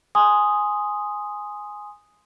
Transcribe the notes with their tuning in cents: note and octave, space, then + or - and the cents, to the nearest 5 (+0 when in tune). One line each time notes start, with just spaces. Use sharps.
G#5 +0 C6 +0 D#6 +0